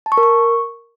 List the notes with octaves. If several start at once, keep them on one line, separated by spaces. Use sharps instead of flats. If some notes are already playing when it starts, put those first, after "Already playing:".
A5
C#6
A#4
C#6